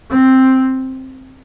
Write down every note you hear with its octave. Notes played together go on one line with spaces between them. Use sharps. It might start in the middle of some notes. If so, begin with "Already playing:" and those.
C4